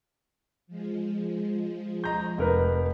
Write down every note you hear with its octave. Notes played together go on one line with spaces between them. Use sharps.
F3 G#3
D#5 A#5 G6
F1 A#4 B4